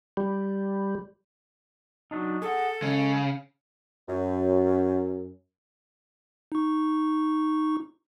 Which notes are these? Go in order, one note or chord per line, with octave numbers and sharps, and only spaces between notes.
G3
F#3 D4 D#4
G#4 A4 F#5
C#3 G#3
F#2
D#4 C#6